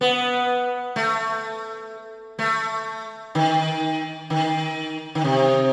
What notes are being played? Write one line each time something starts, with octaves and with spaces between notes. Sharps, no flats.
B3
A3
A3
D#3
D#3
D#3
C3